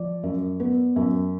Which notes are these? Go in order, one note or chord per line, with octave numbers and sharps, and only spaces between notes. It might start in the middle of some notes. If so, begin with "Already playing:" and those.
Already playing: F3 D5
F#2
B3
F#2